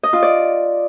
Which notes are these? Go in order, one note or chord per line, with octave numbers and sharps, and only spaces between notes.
D#5
F4
D5